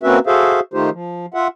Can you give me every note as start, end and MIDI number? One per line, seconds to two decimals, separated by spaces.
0.03 0.19 58
0.03 0.19 60
0.03 0.19 61
0.03 0.19 66
0.03 0.19 71
0.03 0.19 76
0.27 0.60 66
0.27 0.60 68
0.27 0.60 69
0.27 0.60 72
0.27 0.60 76
0.27 0.60 77
0.74 0.90 51
0.74 0.90 57
0.74 0.90 63
0.74 0.90 65
0.74 0.90 67
0.74 0.90 72
0.91 1.26 53
1.34 1.47 65
1.34 1.47 76
1.34 1.47 78